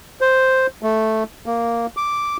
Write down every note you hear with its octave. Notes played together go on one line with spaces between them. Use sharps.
C5
A3
A#3
D6